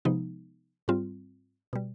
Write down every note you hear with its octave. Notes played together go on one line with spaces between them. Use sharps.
C3 F3 G#3 B3 D#4
G#2 G3 C4 F4
B2 G3